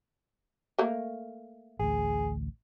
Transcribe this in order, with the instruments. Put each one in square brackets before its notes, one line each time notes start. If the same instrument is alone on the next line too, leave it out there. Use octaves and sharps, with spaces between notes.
[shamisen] A3 A#3
[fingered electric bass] A1 D2 [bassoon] G#4